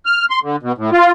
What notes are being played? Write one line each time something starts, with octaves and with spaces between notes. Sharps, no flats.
F6
C6
D3
B2
A2
F4